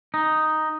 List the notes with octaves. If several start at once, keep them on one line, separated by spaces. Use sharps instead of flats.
D#4